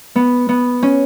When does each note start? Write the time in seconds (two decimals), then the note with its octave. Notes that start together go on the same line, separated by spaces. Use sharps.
0.16 B3
0.49 B3
0.83 C#4